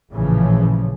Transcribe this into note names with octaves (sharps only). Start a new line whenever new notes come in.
A1 A#2 C#3 E3 F3